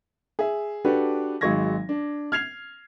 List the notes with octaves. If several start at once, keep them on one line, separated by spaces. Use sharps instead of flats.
G#4 E5
D4 F#4 G4 A4 B4
G#1 F#3 G#3 C#6 G#6 A#6
D4
F6 G#6 C7 F7